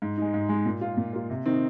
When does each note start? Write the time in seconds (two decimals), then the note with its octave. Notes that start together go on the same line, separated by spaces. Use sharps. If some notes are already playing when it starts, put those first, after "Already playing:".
0.02 G#2
0.17 G#3 D#4
0.34 G#2
0.49 G#3 D#4
0.66 A#2
0.81 A#3 F4
0.97 A#2
1.13 A#3 F4
1.30 C3
1.46 D#3 C4 D#4